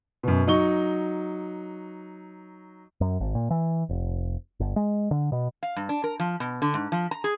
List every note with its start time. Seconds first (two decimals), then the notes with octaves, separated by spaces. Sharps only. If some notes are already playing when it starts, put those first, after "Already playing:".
0.23 F#2 B2
0.47 F#3 D#4 C#6 G7
3.01 F#2
3.20 G#1
3.35 A#2
3.50 E3
3.89 F1
4.60 G1
4.76 G#3
5.11 D3
5.32 B2
5.63 F5
5.76 G2
5.89 D4
6.04 A#4
6.20 F3
6.40 B2
6.62 D3
6.74 G#2
6.92 F3
7.11 A#5
7.24 G#4